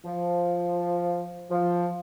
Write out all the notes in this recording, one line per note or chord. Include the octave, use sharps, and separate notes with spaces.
F3
F3